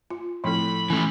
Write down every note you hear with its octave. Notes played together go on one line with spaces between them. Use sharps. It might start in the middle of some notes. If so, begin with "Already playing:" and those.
F4
A2 F3 C4 A4 B5
E3 A3 C#4